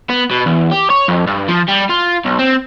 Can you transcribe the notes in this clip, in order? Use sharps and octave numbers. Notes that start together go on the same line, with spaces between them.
B3
B2
E2
G4
C#5
F2
G2
F3
G3
F4
B1
C4